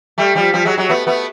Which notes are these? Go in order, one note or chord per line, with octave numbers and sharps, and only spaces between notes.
G3 A3
F3 G3
F3 G3
F#3 G#3
F#3 G#3
A3 B3
A3 B3